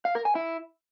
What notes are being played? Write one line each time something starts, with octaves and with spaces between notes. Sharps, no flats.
F5
A#4
G#5
E4